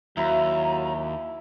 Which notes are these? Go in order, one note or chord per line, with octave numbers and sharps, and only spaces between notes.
D#2 F#3 E4 A#5